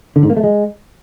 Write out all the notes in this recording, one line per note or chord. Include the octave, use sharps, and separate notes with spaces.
D3
G#2
A#3
A3
G#3